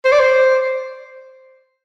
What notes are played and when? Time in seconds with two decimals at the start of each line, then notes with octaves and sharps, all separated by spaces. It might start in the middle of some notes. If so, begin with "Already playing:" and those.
0.04 C5
0.12 D5
0.19 C5